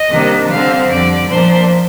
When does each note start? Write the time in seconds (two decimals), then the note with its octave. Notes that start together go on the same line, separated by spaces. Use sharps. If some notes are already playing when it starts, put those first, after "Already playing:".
Already playing: D#5
0.11 C3 D#3 G3 A#3 D4
0.51 D3 G3 C4 F5
0.90 F2 D3 G3 D5
1.29 A#2 F3 A#3 D4 C5